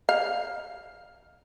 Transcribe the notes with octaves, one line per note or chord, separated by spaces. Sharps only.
F5